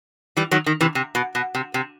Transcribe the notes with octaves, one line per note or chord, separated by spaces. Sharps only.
E3 G3
D#3 F#3
D#3
C3 E3
C3
B2
B2
C3
C3